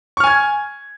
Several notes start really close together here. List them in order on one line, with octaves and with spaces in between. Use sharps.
C#6 F6 G#5 G#6